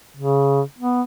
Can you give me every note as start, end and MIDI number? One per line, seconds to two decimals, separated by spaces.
0.17 0.62 49
0.79 1.02 59